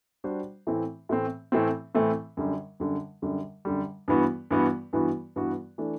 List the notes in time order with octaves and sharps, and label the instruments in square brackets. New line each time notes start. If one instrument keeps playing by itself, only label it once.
[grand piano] G3 D4 F#4 C5
A2 E3 A3 C4
A2 E3 A3 C4
A2 E3 A3 C4
A2 E3 A3 C4
F#2 D3 G3
F#2 D3 G3
F#2 D3 G3
F#2 D3 G3
G2 E3 B3 F#4
G2 E3 B3 F#4
G2 E3 B3 F#4
G2 E3 B3 F#4
E3 A3 D4